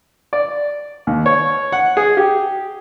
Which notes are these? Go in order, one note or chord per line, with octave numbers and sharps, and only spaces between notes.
D5
D#2
C#5
F#5
G#4
G4